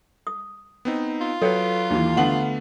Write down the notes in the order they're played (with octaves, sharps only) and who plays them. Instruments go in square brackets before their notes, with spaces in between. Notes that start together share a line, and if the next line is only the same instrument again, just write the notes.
[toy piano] D#6
[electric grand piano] B3 C4 D#4
[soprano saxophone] F4
[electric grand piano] F#3 B4 [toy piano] A4 C#5 G5
[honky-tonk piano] D#2 E3
[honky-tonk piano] D3 F#7 [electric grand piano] A3 B3 [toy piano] F#5 A5